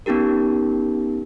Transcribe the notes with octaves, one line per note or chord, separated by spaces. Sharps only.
B3 C#4 D#4 G4 A#4